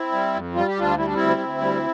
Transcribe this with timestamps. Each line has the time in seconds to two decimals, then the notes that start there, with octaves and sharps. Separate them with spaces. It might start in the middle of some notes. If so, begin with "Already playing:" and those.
Already playing: C4 E4
0.12 G3
0.34 F2
0.54 G3 F4
0.67 G4
0.76 D2 D4 F4
0.98 G3 E4
1.06 D4
1.14 D2 C4 E4
1.40 D2
1.60 G3